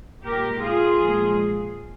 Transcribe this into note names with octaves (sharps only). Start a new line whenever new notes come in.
A#2 G#3 G4 A#4
F4 G#4
A#2 F3 G#3